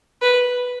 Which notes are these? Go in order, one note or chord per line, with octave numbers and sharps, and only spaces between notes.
B4